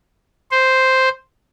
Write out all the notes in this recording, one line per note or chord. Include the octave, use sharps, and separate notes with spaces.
C5